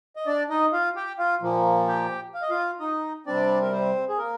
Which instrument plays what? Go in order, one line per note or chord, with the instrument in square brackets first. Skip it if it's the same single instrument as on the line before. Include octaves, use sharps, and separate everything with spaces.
[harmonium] D#5
D4 D5
D#4 D#5
F4 F5
G4 G5
F4 F5
A#2 F3 A#3
G4 G5
F5
D#5
F4 F5
D#4 D#5
C3 G3 C4 D4 D5
A#4
C4 C5
G#4
A#3 A#4